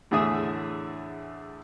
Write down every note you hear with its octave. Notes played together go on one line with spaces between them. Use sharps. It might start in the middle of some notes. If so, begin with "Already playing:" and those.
E2 A2 D3 G#4 E5 D#6